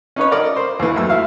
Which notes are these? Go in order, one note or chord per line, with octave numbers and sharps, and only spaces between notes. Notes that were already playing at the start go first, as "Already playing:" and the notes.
C#4 D#4 B4 C#5
A#4 D5 D#5
C5
D#2 E3
F#2 F#3 A3 E6
E4 F5